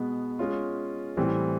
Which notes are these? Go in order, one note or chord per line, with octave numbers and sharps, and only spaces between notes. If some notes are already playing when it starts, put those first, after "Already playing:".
Already playing: B2 G#3 B3
G#3 C#4 F4
A2 E3 G3 C4